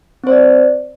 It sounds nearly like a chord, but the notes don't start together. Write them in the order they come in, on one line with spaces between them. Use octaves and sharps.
C4 C5 D5